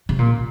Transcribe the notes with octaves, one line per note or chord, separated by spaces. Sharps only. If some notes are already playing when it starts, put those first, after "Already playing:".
C3
A#2